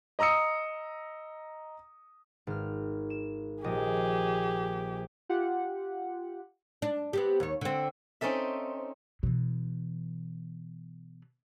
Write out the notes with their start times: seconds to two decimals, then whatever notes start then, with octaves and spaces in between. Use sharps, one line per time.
0.19 D#5 A#5 D#6 E6 C#7
2.47 G#1 F6
3.10 E7
3.64 A#1 G4 G#4 D#5
5.29 F4 G4 F#5
6.82 D4
7.13 B3 C4 G4
7.40 D#2 C#5
7.61 D3 C4
8.21 C4 C#4 D#4 A4 E5
9.23 B2 E3